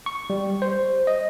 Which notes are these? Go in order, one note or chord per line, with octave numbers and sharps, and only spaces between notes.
C#6
G3
C5
D#5